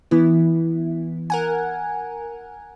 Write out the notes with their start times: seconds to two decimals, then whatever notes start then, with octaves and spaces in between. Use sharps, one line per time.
0.11 E3 B3 E4
1.30 A#4 F#5 G#5